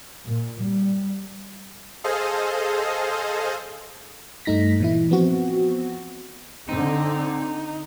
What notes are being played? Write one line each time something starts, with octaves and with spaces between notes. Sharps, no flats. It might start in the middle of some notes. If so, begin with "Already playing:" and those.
A#2
G3
G#4 A4 C5 D#5 F5
G2 A3 D#4 A#6 B6
A#2 E3 E4
F3 B3 C4 F#4
D3 C4 D#4